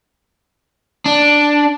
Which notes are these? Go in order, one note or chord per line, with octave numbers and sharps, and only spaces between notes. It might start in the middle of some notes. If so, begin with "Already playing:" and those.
D4